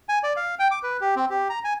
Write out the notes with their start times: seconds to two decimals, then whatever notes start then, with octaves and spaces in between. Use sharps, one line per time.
0.09 G#5
0.24 D5
0.36 F5
0.59 G5
0.71 D6
0.83 B4
1.01 G4
1.16 C4
1.30 G4
1.50 A#5
1.64 G#5